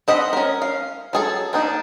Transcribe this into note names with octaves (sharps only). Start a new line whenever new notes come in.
C4 D#5 F#5 B5
C#4 A#4
F5
F#3 G#4 A4
A#3 D4 D#4